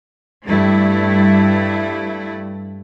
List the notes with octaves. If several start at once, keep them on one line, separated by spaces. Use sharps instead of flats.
G2 G3 A3 E4